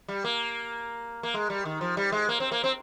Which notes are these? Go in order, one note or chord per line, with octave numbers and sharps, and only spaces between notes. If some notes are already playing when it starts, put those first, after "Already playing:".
G3
A#3
A#3
G#3
G3
D#3
F3
G3
G#3
A#3
C4
A#3
C4